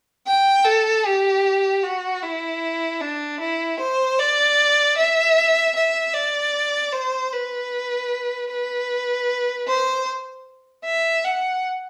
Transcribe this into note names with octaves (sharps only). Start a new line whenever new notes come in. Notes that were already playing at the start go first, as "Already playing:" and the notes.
G5
A4
G4
F#4
E4
D4
E4
C5
D5
E5
E5
D5
C5
B4
B4
C5
E5
F#5